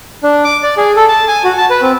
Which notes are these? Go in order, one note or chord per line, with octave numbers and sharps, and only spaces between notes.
D4
D6
D5
G#4
A4
A5
G#5
F#4
A5
B4
C4